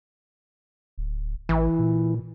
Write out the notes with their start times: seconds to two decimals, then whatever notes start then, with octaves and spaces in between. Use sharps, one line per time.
0.98 D1
1.49 A1 E3
1.79 A#2